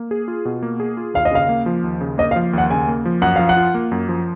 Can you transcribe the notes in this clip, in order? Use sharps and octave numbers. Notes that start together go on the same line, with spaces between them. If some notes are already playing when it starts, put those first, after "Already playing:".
Already playing: A#3
G#4
F4
B2
A#3
G#4
F4
D#2 F5
D#5
C#3 F5
A#3
F3
D#2
C#3
A#3 D#5
F5
F3
D#2 F#5
C#3 G#5
A#3
F3
F#2 F#5
F3 F5
F#5
F4
A#3
F#2
F3